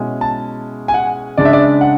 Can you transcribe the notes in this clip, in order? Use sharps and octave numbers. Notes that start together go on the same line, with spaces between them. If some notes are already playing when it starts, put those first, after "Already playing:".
Already playing: B2 G#3 C#4 E4
A5
G#5
F#5
C#3 G#3 D4 D5
E5
D5
F#5